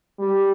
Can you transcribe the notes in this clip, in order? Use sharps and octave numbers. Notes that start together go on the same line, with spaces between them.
G3